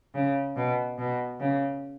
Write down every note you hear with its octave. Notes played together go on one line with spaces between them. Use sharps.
C#3
B2
B2
C#3